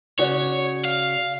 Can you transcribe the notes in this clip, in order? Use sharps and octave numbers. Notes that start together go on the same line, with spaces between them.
C#3 F#4 C#5 D5
F5